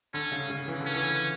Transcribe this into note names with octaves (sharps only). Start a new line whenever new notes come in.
D3 C#4
C#3
C#3
E3
D3
C#4
E3